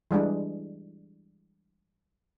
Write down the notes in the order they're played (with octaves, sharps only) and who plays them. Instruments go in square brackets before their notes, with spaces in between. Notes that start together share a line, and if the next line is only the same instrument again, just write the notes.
[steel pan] E3 G3 G#3 D4